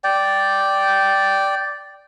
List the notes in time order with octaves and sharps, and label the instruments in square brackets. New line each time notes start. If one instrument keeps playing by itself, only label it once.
[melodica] D5 G5